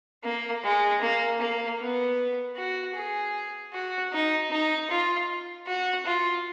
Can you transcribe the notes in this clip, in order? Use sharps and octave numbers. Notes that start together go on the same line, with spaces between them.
A#3
G#3
A#3
A#3
B3
F#4
G#4
F#4
D#4
D#4
F4
F#4
F4